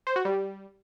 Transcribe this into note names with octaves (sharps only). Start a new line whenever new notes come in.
C5
F#4
G3